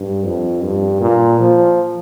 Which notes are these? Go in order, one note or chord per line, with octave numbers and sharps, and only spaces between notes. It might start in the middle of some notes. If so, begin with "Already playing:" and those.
Already playing: G2
F2
G2
A#2
F3